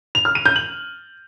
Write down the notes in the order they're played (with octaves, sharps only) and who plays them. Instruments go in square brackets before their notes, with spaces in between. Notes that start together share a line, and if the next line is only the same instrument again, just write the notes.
[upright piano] F7
F6
D#7
G6
F#7